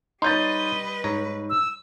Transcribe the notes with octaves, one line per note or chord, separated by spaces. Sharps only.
G3 D#4 B4 C#5 D#5 C6 G6 A6
G#2 C#5 A#5
E6